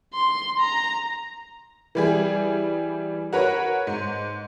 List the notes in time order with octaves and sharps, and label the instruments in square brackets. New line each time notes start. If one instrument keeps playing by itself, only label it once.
[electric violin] C6
A#5
[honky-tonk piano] E3 G3 G#4
F#4 A#4 B4 C#5
G#2